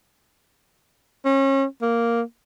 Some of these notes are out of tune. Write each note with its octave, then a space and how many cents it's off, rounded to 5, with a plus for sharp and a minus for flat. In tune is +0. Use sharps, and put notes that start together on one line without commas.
C#4 -30
A#3 +0